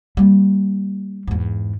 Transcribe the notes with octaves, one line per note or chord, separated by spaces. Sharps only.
G3 A#3
E2 G#2